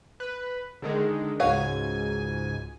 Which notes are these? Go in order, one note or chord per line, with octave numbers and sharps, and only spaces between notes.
B4
D3 D#3 G#3
C#2 G#2 F#4 C#5 F5 G#5